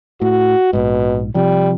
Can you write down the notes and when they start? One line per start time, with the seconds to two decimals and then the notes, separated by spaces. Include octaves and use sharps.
0.21 A2 F#4
0.73 A#1 G#2 B2
1.35 C3 F3 G3